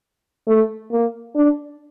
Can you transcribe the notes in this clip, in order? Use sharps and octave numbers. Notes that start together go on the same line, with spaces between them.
A3
A#3
D4